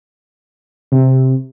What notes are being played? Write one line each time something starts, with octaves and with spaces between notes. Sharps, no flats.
C3